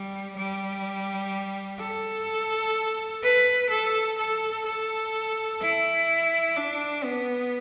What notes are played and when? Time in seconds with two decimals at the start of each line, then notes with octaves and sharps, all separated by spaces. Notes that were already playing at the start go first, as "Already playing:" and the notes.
Already playing: G3
0.36 G3
1.80 A4
3.23 B4
3.70 A4
4.18 A4
4.66 A4
5.61 E4
6.56 D4
7.04 B3